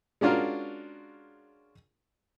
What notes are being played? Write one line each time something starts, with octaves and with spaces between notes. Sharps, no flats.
G#3 C#4 D4 F4 F#4 A#4